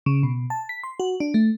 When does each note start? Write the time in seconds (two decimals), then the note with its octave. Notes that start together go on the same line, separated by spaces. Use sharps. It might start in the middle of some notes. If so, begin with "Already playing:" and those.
0.06 C#3
0.23 B2
0.50 A5
0.69 B6
0.83 C6
1.00 F#4
1.20 D4
1.34 A3